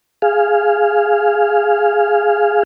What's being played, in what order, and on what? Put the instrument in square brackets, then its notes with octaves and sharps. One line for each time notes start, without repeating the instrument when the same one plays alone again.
[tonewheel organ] G#4 F5